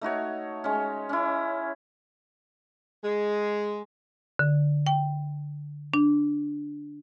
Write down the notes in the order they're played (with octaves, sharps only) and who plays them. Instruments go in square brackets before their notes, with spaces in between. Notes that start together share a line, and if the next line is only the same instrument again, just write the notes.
[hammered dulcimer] A3 D#4 F#4 C#5
G#3 C#4
C#4 E4
[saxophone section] G#3
[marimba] D3
G5
D4